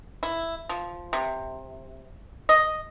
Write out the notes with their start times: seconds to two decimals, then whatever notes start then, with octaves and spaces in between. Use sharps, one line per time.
0.23 E4
0.69 F3
1.13 C3
2.49 D#5